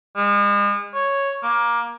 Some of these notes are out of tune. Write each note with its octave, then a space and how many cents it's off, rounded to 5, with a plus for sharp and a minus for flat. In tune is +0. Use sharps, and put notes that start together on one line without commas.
G#3 -40
C#5 +0
A#3 +20